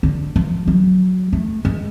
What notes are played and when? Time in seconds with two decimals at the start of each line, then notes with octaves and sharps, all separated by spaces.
0.03 D3
0.36 F3
0.68 F#3
1.33 A3
1.65 G#3